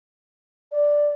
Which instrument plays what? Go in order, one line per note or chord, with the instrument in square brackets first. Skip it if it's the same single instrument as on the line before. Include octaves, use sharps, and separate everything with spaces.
[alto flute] D5